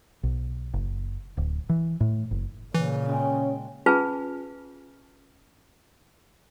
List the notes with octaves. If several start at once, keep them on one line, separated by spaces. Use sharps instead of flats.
B1
F#1
D1
E3
A2
F#1
A#2 C#3 E3
G#3 C#4 G5
C#4 F4 G#4 B4 G#5 A5